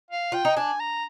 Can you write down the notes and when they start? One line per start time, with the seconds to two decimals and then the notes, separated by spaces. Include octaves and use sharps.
0.11 F5
0.32 F4 G5
0.45 D#4
0.57 D4 G#5
0.80 A#5